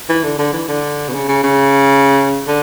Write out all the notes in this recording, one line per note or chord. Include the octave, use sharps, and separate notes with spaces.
E3
D3
D3
E3
D3
B2
C#3
C#3
C#3
D3